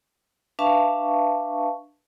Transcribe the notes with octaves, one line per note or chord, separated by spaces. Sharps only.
D4 B4 E5 F5 A5 C#6